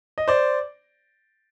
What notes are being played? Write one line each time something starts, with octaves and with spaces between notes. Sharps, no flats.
D#5
C5 D5